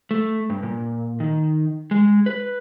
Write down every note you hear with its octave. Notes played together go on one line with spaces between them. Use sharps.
A3
G2
A#2
D#3
G#3
B4